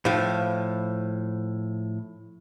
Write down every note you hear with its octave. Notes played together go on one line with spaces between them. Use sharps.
A2 F3